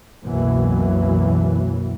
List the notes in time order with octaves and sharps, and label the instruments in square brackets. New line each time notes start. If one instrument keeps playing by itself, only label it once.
[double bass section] C2 F#2 B2 E3 F#3 A#3